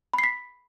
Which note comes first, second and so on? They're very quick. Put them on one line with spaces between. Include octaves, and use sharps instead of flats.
B5 C7 B6